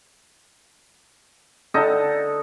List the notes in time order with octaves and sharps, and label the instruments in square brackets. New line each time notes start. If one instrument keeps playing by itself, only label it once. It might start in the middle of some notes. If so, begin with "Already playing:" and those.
[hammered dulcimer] D3 D#4 A4 D#5